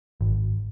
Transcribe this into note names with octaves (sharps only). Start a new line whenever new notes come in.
G#1